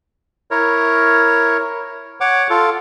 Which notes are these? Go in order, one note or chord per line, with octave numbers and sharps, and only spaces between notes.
E4 A#4 C#5
C#5 F#5 D6
F4 A4